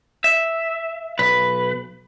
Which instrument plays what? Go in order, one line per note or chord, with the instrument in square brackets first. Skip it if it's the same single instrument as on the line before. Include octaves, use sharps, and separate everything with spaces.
[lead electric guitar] E5
B1 B4